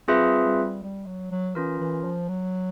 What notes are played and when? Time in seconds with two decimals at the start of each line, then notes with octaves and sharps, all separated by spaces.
0.08 G3 C4 F4 G#4 B4 E5
0.18 F#3
0.29 G3
0.45 G3
0.82 G3
1.06 F#3
1.31 F#3
1.55 E3 C#4 F4 A#4
1.79 E3
2.04 F3
2.29 F#3